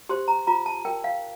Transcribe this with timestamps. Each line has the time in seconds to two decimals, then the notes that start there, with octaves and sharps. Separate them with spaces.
0.09 G4 C5 C6
0.28 A#5
0.47 F4 A#5
0.66 A5
0.85 A#4 G5
1.04 F5